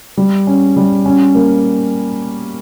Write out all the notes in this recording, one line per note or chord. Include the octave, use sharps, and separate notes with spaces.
G3
C#4
G3
C#4
A#3